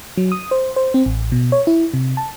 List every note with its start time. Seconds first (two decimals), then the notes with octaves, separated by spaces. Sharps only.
0.17 F#3
0.32 D#6
0.51 C5
0.76 C5
0.94 C4
1.06 A1
1.32 B2
1.52 C#5
1.67 E4
1.94 C3
2.17 A5